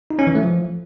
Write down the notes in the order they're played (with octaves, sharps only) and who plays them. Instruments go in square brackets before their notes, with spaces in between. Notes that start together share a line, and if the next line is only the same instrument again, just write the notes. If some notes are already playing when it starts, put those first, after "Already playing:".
[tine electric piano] D#4
C#4
E3
A3
F3